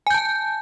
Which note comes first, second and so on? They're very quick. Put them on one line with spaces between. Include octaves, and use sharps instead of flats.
G#5 G6 A5